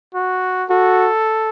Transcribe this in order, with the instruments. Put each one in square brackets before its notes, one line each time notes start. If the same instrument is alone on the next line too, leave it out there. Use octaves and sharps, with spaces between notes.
[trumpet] F#4
[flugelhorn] F#4 [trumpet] A4